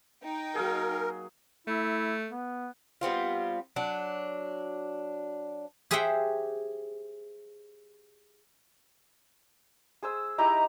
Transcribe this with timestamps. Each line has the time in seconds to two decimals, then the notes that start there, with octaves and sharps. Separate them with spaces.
0.24 D#4 G5
0.55 F#3 A#3 G#4 A#4
1.67 A3 E4
2.31 B3
3.01 G3 B3 C4 F4
3.76 F#3 D4
5.91 G4 G#4 C5 E5 F#5 G5
10.03 G#4 C5 E6
10.38 D#4 E4 G4 A#5